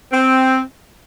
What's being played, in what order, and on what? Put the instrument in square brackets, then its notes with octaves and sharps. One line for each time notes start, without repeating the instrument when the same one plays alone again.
[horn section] C4